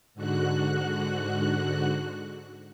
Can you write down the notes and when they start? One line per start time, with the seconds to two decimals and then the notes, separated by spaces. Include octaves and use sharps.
0.15 G#2 D3 F#4 F#6